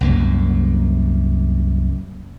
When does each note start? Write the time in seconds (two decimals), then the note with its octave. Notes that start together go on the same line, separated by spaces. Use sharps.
0.01 C2 F#2 A#3